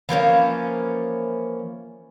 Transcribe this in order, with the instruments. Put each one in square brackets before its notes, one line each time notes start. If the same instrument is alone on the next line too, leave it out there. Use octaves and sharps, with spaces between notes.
[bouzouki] E3 F3 A#3 C#4